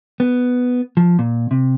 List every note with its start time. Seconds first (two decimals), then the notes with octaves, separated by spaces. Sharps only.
0.20 B3
0.97 F3
1.19 A#2
1.51 C3